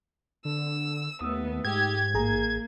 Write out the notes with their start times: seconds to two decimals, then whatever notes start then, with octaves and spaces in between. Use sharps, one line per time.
0.45 D3 E6
1.21 D#2 A3 B3 D#6 E6
1.65 G#2 G4 G#6
2.14 A1 A#3 G#4 A#5